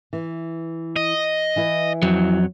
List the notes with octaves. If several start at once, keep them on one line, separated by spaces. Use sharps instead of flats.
E3
D#5
E3 E4 B4
F2 F#3